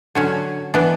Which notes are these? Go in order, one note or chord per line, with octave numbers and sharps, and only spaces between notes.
D3 F#3 C#4
E3 B3 D4